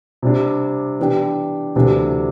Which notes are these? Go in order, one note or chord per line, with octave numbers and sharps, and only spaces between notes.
C3 G3 D4
E3 B3 D4 G4
D2 C3 E3 G3 D4